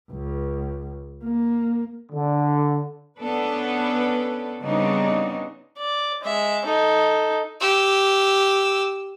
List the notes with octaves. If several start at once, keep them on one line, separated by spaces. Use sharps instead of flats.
C#2
A#3
D3
B3 C#4 D4 A4 B4
C#3 G3 B3 C4 D4 D#4
D5
G#3 E5
D#4 A4
G4 E6